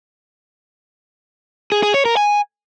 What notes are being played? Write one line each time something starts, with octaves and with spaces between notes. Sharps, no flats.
G#4
G#4
C#5
A#4
G#5